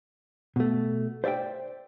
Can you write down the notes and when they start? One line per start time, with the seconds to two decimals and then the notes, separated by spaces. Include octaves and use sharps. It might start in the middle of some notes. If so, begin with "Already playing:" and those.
0.56 B2 A3
1.24 C5 D5 E5 F5 G5